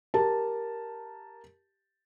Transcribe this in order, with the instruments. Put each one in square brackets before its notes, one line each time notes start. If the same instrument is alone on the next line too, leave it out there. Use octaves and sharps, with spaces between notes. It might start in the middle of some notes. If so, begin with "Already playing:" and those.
[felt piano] G4 A#4 A5